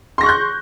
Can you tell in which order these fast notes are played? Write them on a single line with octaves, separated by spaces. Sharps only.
C6 A#6 C#6 F#6 G6